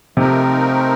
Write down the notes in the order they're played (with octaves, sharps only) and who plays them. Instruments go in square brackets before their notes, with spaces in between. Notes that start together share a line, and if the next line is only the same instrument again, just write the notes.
[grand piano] C3 [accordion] F3 A3 C4 D#4 A#4